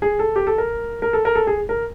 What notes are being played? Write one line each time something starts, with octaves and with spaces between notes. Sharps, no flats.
G#4
A4
G4
A4
A#4
A#4
A4
A#4
A4
G#4
A#4